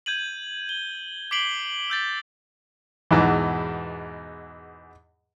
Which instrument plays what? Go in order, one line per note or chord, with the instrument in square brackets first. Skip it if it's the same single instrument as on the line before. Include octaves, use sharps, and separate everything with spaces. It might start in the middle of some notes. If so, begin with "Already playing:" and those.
[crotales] G6 G#6 D#7 F#7
G7
D6 B6 C7 D7 F#7 G7
E6 G6 A6 B6
[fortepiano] E2 G#2 B2 E3